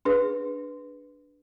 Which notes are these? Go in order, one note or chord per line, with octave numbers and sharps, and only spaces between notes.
D4 G#4 B4